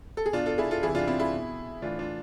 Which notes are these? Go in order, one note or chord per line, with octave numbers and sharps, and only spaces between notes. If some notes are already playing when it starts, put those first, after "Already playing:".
A4
G#4
B2 D4 F4
F4 A4
E4 G#4
F4 A4
C3 E3 E4 G#4
D4 F4
C4 E4
E4 G#4
B2
A2 E3 D4 F4
D4 F4